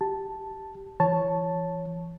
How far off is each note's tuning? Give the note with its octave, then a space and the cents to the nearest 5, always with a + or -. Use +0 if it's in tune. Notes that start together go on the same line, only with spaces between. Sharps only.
G4 -10 A5 +0
E3 +35 C#5 +0 A5 +0